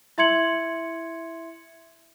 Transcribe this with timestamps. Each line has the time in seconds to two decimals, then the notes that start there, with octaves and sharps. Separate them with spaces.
0.18 E4 E5 C6 G#6 C#7 F#7